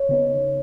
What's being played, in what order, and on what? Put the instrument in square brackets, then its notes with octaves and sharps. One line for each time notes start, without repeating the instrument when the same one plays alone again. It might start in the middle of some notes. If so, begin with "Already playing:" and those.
Already playing: [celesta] C#5
[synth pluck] C#3 B3 D#4